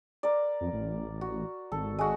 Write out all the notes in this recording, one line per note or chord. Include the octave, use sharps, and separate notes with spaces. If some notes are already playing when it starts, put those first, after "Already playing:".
A#4 D5
F2
A1
F#4
G#1 A4
G#3 F#4